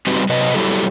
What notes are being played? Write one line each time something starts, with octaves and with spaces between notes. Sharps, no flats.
G3 C4 D#4 F#4 G4 B4
C3 F#3 B4 D#5
F#3 G3 E4 G4 A4